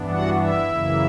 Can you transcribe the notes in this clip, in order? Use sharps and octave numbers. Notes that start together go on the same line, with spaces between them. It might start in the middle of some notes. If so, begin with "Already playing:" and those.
Already playing: G2 E3 B3 D4
F#4 F#5
E4 E5
F#2 C#3 E3 A#3